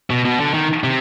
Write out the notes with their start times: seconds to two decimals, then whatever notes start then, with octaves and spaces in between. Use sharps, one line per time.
0.10 B2
0.25 B2
0.40 D3
0.54 D#3
0.84 C3